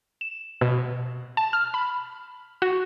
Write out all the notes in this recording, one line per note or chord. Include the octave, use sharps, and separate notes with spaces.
E7
B2
A5
F6
B5
F#4